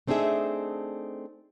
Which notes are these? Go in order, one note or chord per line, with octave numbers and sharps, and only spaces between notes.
A3 C4 D4 D#4 G#4 E5